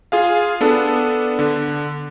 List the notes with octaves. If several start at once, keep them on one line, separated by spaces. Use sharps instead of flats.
F4 G#4 F5
B3 D4 A4
D3